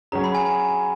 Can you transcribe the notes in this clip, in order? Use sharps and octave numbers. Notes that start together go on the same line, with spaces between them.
F#3 C#4 G#4 A#5
B5
G#5
G#5